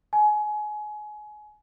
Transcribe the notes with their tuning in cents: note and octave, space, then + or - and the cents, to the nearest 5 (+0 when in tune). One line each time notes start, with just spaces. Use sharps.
G#5 +25